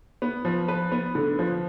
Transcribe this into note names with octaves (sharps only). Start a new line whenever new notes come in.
B3
F3
B4
B3
D3
F3